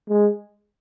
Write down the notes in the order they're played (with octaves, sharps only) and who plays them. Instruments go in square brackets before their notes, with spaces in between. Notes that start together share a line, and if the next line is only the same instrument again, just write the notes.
[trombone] G#3